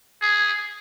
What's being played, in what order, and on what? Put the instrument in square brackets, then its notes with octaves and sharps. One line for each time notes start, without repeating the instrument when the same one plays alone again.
[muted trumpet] G#4